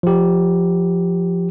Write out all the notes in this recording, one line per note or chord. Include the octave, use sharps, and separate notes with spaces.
F3 G4